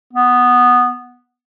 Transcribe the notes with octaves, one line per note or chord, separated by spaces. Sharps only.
B3